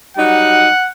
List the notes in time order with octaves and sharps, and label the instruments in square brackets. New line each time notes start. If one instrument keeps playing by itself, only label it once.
[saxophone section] F#3 G3 D#4 [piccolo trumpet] F#5